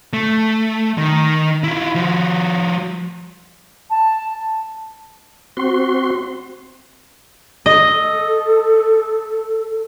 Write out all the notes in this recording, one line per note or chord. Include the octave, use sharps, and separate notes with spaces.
A3
D#3
E4 F4
F3 F#4
A5
C4 F#4 C6
A4 D#5